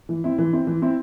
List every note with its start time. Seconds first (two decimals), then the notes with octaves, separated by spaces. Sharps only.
0.09 E3
0.24 C4 E4
0.38 E3
0.53 C4 E4
0.67 E3
0.82 C4 E4